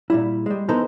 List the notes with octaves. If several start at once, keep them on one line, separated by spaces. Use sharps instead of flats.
A#2 G3 E4
G3 G#3
E3 B3 D#4 A4 A#4 C5